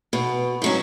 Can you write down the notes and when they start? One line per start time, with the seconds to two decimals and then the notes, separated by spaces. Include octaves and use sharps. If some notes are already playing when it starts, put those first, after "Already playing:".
0.13 B2
0.62 G#2 F#3 C#4